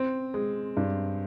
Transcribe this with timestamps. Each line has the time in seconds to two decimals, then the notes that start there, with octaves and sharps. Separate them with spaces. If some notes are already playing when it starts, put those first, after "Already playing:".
Already playing: C4
0.34 G#3
0.77 G2